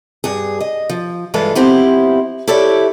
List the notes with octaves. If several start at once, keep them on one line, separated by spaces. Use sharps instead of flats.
G2 G#4
D#5
F3
G2 E3 G#3 F4 A4 B4
F3 B3 C4 E4 G4 C5
E4 G4 A4 C#5 D5 E5